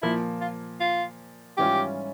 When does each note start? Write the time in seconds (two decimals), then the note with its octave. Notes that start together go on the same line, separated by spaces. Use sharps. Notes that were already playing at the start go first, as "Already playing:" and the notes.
0.02 A#2 F3 A#3 E4
0.41 F4
0.81 F4
1.57 G#2 E3 G3 C#4 F4 G4